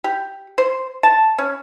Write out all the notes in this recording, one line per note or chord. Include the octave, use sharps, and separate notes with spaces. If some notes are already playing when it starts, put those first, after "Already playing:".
G4
C5
A5
C#4